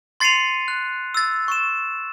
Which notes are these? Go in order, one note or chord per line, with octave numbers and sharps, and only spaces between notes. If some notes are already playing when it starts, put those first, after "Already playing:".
C6 A6 C7 C#7 D#7 F7
F#6
E6 A6
C#6 E7